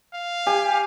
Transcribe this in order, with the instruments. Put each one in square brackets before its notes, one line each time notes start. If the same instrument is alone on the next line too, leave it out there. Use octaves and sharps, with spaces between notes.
[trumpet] F5
[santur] G4 [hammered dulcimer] G#5